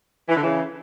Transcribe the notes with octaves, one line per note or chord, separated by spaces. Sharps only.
E3
D3
C#3 E3